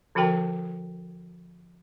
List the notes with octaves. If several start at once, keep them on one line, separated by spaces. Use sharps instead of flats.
D3 F3 F#4 A#4 G5 A5